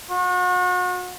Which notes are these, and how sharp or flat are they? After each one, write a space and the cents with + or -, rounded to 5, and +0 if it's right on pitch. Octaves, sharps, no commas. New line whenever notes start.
F#4 -40